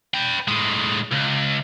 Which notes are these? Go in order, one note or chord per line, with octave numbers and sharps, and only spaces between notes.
B4 G5
A2 G#3
C#2